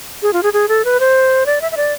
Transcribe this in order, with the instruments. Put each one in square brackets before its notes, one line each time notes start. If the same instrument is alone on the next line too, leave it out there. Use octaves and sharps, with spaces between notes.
[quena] G#4
F4
G#4
G#4
A4
B4
C5
D5
E5
E5
D5